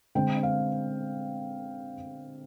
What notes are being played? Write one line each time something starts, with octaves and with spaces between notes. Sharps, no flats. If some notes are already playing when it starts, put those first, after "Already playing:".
D3 G#3 C4 G5
F5